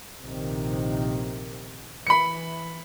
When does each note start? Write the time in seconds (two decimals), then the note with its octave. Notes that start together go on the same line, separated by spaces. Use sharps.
0.21 A#1 C3 D#3
2.07 E3 B5 C#7